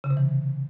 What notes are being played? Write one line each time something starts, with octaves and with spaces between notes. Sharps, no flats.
C#3
C3
E3